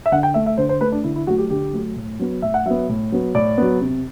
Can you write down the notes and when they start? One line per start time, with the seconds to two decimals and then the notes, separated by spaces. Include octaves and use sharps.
0.06 E5
0.12 D3 F#5
0.23 G5
0.34 A3 E5
0.46 E5
0.57 D3 C5
0.69 C5
0.81 A3 B4
0.92 D4
1.04 D3 E4
1.16 E4
1.27 F#3 A3 F#4
1.38 G4
1.50 D3 G4
1.73 F#3 A3
1.96 A2
2.19 F#3 B3
2.42 A2 E5
2.54 F#5
2.66 F#3 B3 E5
2.89 A2
3.12 F#3 B3
3.35 A2 D5
3.58 F#3 B3
3.81 C3